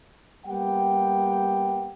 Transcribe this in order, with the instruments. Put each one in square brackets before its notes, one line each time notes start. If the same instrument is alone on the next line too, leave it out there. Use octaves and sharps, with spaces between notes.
[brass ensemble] G3 A#3 B3 G4 F#5 G5